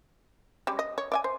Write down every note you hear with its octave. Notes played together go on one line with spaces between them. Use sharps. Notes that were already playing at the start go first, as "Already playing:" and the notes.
G3 G#3 C#4
D#5
C#5
D5 E5 G#5
C5